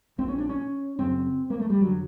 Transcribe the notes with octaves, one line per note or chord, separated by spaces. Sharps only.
A#1 A#2 C4
C#4
D4
C#4
F#1 F#2 C#3 C4
A#3
A3
G3
F1 D3 F#3